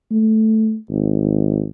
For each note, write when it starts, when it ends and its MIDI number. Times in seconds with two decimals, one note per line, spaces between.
0.11 0.76 57
0.89 1.67 32